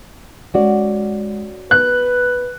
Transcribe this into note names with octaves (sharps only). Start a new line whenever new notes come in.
G#3 C#4 F#4 D5
B3 B4 F#6